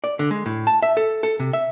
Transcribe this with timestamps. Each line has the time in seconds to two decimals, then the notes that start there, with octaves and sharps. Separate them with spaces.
0.04 D5
0.19 D3
0.31 G#3
0.46 A2
0.67 A5
0.82 E5
0.97 A4
1.23 A4
1.40 C3
1.53 E5